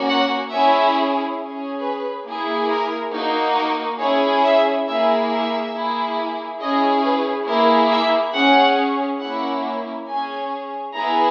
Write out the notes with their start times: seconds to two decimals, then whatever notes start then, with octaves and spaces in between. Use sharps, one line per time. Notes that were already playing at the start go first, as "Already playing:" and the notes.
Already playing: A#3 C#4 F#4
0.09 F#5
0.52 C#4 E4 G#4 E5
1.40 C#4 G#4
1.82 B4
2.26 A#3 E4 G#4
2.69 A#4
3.14 A#3 D#4 F#4
3.57 A#4
4.00 C#4 E4 G#4 C#5
4.44 E5
4.87 A#3 E4 G#4 E5
5.31 E5
5.74 A#3 E4 G#4
6.61 C#4 E4 G#4 D#5
7.04 B4
7.48 A#3 E4 G#4 A#4
7.91 E5
8.35 C#4 G#4 F#5
9.21 A#3 C#4 E4 F#5
10.09 C#4 G#4 G#5
10.96 B3 E4 G#4 A#5